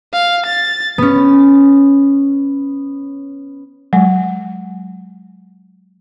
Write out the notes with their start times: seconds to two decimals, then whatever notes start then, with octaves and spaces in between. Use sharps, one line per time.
0.13 F5
0.46 A6
0.98 B3 C#4
3.93 F#3 G#3